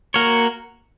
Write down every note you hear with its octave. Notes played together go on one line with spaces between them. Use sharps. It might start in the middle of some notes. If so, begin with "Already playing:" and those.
A#3 F#4 A#4 C#5